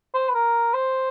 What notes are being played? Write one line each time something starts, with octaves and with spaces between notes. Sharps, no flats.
C5
B4
A#4
C5